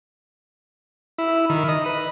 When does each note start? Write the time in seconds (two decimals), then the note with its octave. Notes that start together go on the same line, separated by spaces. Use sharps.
1.18 E4
1.50 D#3
1.68 D#5
1.86 B4